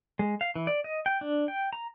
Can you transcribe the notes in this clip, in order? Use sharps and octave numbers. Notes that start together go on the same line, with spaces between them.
G#3
F5
E3
D5
D#5
G5
D4
G5
A#5